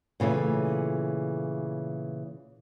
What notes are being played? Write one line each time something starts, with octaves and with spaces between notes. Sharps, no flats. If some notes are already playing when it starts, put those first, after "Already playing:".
A#2 C#3 E3 A3